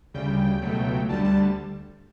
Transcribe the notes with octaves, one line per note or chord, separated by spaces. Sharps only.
D2 C#3 G3 G5
C#2 B2 F#3 A3
D2 D3 G3 A5
A5